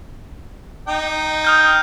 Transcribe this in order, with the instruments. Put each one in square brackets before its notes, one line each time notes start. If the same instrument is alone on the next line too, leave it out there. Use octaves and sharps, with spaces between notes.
[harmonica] D#4 G5
[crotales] D#6 F6 G6